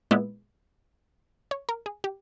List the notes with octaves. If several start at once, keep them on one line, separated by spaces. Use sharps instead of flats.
A#2 G#3 B3 E4
C#5
A#4
G#4
G4